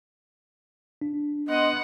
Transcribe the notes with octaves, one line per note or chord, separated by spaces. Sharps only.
D4
B3 D#5 F#5 C6